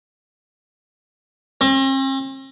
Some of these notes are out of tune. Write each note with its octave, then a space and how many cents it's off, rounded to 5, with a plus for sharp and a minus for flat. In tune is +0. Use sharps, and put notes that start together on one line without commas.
C4 +45